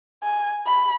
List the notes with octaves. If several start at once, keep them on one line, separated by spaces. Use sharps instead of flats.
G#5
B5